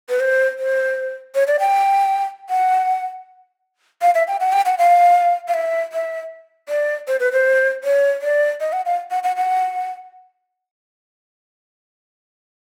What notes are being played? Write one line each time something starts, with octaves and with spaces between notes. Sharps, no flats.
B4
C5
C5
C#5
D5
G5
F#5
F5
E5
G5
F#5
G5
F#5
F5
F5
E5
E5
D5
C5
B4
C5
C#5
D5
D#5
F#5
F5
F#5
F#5
F#5